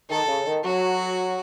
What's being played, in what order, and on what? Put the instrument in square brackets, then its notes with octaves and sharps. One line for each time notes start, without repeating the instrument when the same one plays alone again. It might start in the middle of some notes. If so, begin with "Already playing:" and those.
[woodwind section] D#3 [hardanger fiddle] A4
[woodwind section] C#3
D#3
[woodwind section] F#3 [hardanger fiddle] F#4